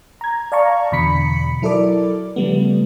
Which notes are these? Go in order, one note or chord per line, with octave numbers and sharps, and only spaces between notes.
A#5 G#6
D5 F5 A5 A#5 C#6
E2 B2 D3 B5 B6 C#7
F#3 E4 A4 A#4 D5 D6
C#3 F3 G3 A3 B3